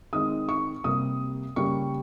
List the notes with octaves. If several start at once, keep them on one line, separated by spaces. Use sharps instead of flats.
D#3 G#3 C4 D#6
C#6
C3 G3 A#3 D#6
C#3 G3 A#3 C#6